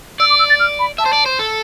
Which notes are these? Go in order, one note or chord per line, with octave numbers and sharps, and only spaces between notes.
D5 E6
D6
E6
A6
F6
B5
E5 A5
C5
D5
C5
A4